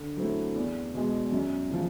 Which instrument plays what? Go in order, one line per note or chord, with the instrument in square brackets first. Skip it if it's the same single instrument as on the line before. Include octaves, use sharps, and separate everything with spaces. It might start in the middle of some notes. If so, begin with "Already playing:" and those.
Already playing: [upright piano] D3
F#3 A3 C4 E4
E2
B2 G#3
F#2
C#3 F3